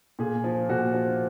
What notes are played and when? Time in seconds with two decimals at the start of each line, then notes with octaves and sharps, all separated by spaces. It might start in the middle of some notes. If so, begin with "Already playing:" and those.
0.19 A#2 G#4
0.44 F3
0.69 A#2 F#4
0.94 F3